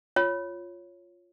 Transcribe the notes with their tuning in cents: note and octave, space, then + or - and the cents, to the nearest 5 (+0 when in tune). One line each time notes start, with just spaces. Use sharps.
F4 +0 C#5 +0